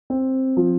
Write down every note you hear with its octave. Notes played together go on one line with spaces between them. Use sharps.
C4
F3